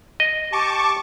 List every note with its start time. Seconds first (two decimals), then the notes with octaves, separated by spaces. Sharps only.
0.20 D#5
0.52 G4 A5 C#6 D6